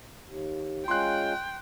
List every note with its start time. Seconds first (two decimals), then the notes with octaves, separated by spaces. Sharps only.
0.23 D#2
0.88 G#3 C#4 F4 G5 C6 F#6